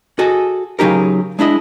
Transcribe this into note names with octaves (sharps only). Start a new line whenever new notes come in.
F#4 G#4 A4 D#5
C#3 F#3 D#4 G4 A#4
G#3 D4 E4 D#5